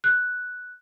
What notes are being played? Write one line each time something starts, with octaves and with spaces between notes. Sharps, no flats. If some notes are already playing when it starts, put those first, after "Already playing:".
F#6